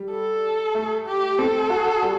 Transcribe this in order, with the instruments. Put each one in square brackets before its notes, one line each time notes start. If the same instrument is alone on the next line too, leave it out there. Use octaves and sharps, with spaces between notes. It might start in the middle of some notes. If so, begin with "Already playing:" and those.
Already playing: [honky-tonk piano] G3
[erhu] A4
[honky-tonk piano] A3
[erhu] G4
[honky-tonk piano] C4 [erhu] A4
[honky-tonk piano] F#4
G3